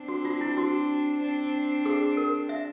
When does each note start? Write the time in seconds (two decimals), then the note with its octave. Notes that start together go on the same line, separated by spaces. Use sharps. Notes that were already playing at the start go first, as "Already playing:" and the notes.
Already playing: C4 D4
0.08 F#4
0.25 F4
0.41 E4
0.57 F#4
1.20 C4 D4
1.86 G#4
2.17 A#4
2.49 E5